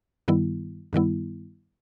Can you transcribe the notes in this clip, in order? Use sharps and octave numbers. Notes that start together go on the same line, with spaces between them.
G2 D#3 G3 B3 E4
G2 D#3 G3 B3 E4